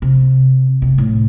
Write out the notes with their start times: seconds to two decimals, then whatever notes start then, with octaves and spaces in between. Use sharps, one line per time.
0.02 C3
0.82 C3
0.98 A2